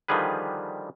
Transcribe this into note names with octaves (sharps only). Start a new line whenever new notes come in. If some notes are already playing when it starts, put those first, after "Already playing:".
D3 D#3 F3 G3 G#4 B4